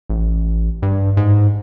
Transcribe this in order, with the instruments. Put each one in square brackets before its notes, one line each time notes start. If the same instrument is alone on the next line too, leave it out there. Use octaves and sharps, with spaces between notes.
[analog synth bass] A1
G2
G#2